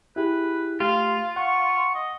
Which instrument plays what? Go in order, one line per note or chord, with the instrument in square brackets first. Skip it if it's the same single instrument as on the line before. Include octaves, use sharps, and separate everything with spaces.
[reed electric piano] E4 G4 G#4 [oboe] B4
[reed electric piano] A3 G4 [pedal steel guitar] F4 [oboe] F5
[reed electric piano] F#5 [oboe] C#6
[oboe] D#5